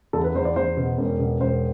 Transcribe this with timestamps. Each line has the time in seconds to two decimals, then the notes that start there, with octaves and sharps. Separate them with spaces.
0.13 E2 A4
0.24 B4
0.35 E2 C5
0.45 D5
0.56 E2 C5
0.77 B2
0.98 E1
1.18 B2
1.40 E1 C5